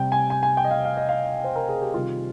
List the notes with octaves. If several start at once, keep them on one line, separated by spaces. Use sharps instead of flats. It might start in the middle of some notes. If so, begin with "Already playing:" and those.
Already playing: C3 G3 G5
G#5
G#5
G#5
G5
D#5
F5
F5
D#5
F5
C5
A#4
G#4
G4
C3 D#3 G3 F4